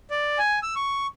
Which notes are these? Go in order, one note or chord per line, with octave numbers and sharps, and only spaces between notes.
D5
G#5
E6
C#6